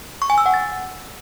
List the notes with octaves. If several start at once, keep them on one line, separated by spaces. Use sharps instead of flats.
C#6
G#5
E6
F#5
A6